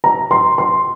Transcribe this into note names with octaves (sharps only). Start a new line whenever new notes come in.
A#5
C6
C6